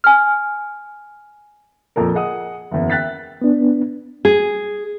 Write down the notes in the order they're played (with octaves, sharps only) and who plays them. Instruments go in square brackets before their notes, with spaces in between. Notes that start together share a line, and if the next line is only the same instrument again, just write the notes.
[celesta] G#5 F6
[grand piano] F2 A#2 A4 A#4
G#4 D#5 F#5 D#6
F#1 E2
E5 G5 F#6 A6 B6
[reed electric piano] B3 D4
[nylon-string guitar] G#4